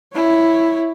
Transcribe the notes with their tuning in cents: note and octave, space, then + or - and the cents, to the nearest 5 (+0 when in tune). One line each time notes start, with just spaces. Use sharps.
E4 +0 C#5 +0